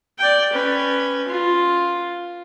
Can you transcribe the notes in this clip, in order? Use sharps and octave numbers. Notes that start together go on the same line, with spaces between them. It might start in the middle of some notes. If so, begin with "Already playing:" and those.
D5 G5
C#4 B4
F4